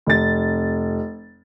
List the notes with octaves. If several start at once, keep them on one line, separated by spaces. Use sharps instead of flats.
F1 A6